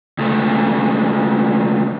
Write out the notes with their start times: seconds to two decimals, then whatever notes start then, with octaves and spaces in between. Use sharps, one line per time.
0.19 C#2 A3